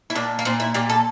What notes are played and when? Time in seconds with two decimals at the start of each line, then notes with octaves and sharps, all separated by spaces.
0.10 E4
0.15 A#2 D4
0.39 A#3
0.45 A#2 C4
0.60 E4
0.74 A#2 G4
0.90 A4